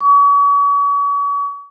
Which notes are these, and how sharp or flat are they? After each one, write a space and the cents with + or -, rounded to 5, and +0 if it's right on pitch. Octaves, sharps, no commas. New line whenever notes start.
C#6 +40